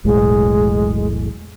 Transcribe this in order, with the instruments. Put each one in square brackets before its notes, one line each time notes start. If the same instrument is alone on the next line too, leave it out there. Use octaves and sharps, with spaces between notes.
[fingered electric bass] E1 B1 A2 [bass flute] G#3